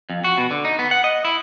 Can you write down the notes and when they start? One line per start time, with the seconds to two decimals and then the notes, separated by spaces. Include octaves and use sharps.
0.10 F2
0.24 F#4
0.38 B2
0.51 D3
0.65 D#4
0.79 B3
0.91 F#5
1.04 D#5
1.25 E4